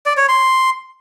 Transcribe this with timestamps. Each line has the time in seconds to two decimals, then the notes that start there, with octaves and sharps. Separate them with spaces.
0.06 D5
0.17 C#5
0.29 C6